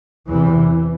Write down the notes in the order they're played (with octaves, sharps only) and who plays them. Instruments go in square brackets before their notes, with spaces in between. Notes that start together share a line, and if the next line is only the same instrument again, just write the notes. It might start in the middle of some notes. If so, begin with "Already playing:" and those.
[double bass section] E2 C3 E3